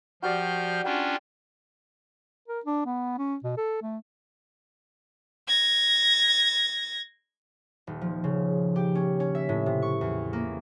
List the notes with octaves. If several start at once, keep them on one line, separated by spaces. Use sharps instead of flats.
F3 F#4 G4 D5 F6 G6
C#4 D4 F4 G5 D6
A#4
D4
B3
C#4
B2
A4
A3
G#6 A#6
D#1
F3
C#3
G4
C#4
C#4
E5
A2
C3
C#6
E2
A#3